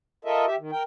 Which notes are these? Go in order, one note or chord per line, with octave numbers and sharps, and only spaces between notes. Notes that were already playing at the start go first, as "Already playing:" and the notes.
F4 A4 A#4 D#5 E5
G4 E5
D#3
A#4 G5